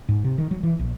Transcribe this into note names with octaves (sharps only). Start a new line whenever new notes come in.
G#2
C3
D#3
F#3
E3
A#1